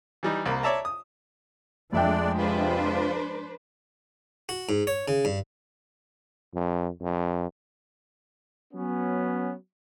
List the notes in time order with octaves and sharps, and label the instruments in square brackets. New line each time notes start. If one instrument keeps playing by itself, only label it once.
[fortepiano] E3 G3 D#4
C2 A#3 B5
C#5 D5 E5 A5 A#5
D#6
[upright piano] F2 E5 G5 [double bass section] F3 G#3 [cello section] A3 [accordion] D4 D5
[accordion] C3 F4 [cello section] D4 B4 C5
[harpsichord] F#4
G#2
C#5
C#3
G2
[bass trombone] F2
F2
[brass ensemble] F#3 B3 C#4